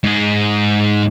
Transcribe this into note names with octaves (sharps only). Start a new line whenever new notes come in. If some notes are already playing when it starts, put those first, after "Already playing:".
G#2 G#4